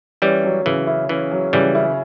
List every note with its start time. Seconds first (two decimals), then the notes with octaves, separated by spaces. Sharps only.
0.22 E3 G3 C#4
0.44 F#3
0.66 C#3 E3
0.87 E4
1.09 E3 C#4
1.31 F#3
1.53 C#3 E3 G3
1.75 E4